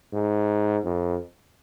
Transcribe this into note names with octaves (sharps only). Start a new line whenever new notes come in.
G#2
F2